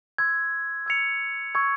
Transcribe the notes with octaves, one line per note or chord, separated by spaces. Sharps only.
C6 E6 G#6
E6 G#6 C#7 F7
C#6 E6 G#6